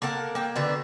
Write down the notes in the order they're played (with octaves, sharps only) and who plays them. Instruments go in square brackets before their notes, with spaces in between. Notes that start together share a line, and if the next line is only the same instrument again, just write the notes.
[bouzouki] A#3 A4 A#4 F#5
A#3 G5
D3 B3 D4 F#4